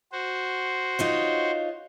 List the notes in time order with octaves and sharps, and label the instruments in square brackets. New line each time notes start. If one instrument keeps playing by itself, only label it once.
[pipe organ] F#4 C5
[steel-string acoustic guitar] D#4 F4 C#5